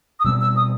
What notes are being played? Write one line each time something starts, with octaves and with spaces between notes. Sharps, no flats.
D#6
B2 G3 C4 E6
E6
D#6